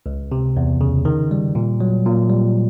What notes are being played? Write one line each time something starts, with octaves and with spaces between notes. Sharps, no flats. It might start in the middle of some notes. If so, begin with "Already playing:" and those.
C#2
C3
E2
C#3
D#3
G3
A#2
F#3
A#2
G3